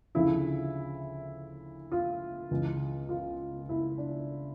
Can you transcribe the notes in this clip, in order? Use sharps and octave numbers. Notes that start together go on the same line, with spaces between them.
D2 C#3 F3 E4
F4
C#2 C#3 E3
F4
E4
D4